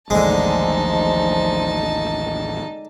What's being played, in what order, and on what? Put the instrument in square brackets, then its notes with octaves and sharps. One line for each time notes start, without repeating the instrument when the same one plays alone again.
[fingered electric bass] A1 D#2 A2 [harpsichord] D3 G#3 [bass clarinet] F3 [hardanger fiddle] D#4 A5